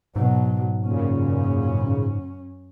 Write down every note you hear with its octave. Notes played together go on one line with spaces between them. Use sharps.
G#2 B2 F#3
F#2 A#2 C#3 C#4